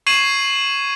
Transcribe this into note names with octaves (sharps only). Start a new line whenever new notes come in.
C#6 G#6 C7 D#7 E7 F#7